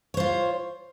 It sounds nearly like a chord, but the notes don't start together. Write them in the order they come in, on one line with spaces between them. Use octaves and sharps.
C#5 C5 F4